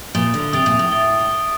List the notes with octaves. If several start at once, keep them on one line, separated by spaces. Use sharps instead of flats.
A#2 D#6 A6 D7 G7
D3
C3 D#6 A6 D7 G7
A#2
A2
D#6 A6 D7 G7